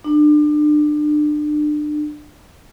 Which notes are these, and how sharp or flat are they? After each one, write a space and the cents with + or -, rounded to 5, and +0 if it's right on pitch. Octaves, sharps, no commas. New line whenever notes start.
D4 +30